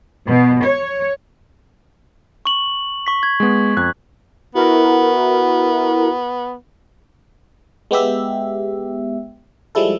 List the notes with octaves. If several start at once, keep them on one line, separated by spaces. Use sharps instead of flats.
B2
C#5
C#6 F#7
C#6 B6
G#6
G#3 B3
F2 F#6 G#6
B3 E4 F#4 A#4
G#3 B3 G4 E5
F3 G3 G#3 E4 A4